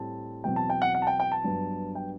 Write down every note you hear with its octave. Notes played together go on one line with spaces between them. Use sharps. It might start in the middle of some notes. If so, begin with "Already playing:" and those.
Already playing: A2 G3 C4 A5
E2 B2 F#3 C4 G5
A5
G5
F#5
F#5
A5
G5
G5
A5
G2 F#3 B3
G5